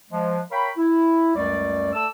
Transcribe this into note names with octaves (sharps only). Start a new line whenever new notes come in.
F3 G#3
A#4 C#5 F5 G5 B5
E4
C#2 F#2 G3 A3 D5
A3 A4 D5 E6